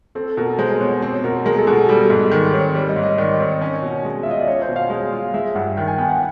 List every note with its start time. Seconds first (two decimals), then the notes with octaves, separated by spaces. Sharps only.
0.15 C4 A4
0.37 B2 A#4
0.59 G#3 C5
0.80 B2 C#5
1.02 C4 C5
1.24 B2 A#4
1.45 G#3 A#4
1.58 A4
1.67 B2 G#4
1.89 G3 A4
2.10 G#2 G#4
2.31 D#3
2.53 C4 C#5
2.75 G3 C#5
2.89 D#5
2.96 G#2
3.03 D#5
3.18 D#3 D5
3.39 C4 C#5
3.61 C#4
3.82 B2
4.05 G#3
4.23 F4 E5
4.31 D#5
4.39 D5
4.47 C#4 C#5
4.62 C5
4.69 B2
4.76 F5
4.90 G#3
5.13 F4
5.34 G#3 E5
5.55 G2 F#5
5.77 D#3 G5
5.87 G#5
5.98 B3 G5
6.09 F#5